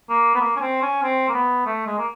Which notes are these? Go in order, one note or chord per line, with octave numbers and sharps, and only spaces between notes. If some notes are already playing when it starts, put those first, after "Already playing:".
A#3
B3
A#3
C#4
C4
C#4
C4
A#3
B3
A3
G#3
A#3